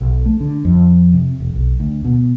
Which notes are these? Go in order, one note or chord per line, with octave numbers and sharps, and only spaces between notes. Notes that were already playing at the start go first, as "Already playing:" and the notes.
B1
A3
D3
F2
C3
E1
B1
D2
B2